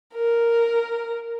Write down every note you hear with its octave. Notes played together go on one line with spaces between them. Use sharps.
A#4